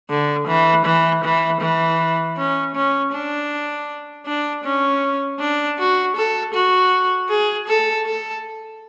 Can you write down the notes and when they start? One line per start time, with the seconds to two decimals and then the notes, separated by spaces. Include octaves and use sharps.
0.10 D3
0.47 E3
0.85 E3
1.24 E3
1.61 E3
2.37 C#4
2.75 C#4
3.12 D4
4.26 D4
4.64 C#4
5.40 D4
5.78 F#4
6.16 A4
6.54 F#4
7.29 G#4
7.67 A4
8.06 A4